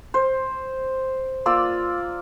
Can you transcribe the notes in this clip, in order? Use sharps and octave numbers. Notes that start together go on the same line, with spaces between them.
C5
A#3 F4 D5 E6